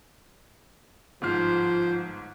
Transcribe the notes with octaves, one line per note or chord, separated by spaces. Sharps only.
G1 G#2 F3 C5 F6